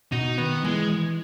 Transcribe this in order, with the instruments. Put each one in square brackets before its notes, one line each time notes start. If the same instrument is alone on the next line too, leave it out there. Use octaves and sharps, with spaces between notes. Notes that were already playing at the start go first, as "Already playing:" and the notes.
[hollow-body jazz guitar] B2 [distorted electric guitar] D#4
[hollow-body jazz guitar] D#3 [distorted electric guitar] B3
[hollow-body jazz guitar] E3 [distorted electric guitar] G#3